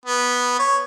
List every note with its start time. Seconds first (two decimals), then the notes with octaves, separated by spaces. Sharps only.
0.06 B3
0.59 C#5